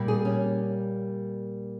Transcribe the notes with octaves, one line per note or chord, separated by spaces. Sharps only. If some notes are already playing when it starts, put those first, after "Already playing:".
Already playing: A#2 G3 A#3
G#4
C#4